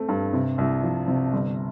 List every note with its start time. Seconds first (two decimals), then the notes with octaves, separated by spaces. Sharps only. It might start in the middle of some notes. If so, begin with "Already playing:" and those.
Already playing: A3 C4
0.09 G2
0.33 C3
0.58 C2
0.83 F3
1.08 C3
1.33 G1